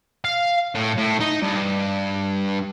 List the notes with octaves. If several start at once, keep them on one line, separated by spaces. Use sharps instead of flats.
F5
A2
A2
D#4
G2